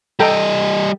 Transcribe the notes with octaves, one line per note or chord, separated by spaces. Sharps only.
G3 A4 D#5 G5 A#5